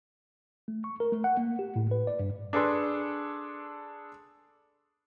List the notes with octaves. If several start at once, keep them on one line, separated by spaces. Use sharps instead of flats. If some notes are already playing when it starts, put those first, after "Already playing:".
A3
C#6
A#4
A3
F#5
A#3
G4
A2
B4
D5
G2
D4 G#4 A4 B4 D5 C6